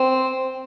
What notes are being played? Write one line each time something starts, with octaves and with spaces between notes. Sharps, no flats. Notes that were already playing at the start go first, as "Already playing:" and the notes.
Already playing: C4